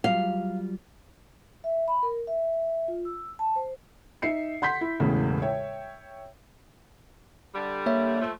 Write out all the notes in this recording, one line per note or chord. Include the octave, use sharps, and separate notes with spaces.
F#3 G3 F4 F5
E5
B5
A#4
E5
F4
E6
A5
C5
D#4 E5 C7 C#7
F#5 C6 G6 B6
E4
E1 E2 A2 C#3
C#5 E5 G5
D3 G3
A#3 C#5 E5
F3 A3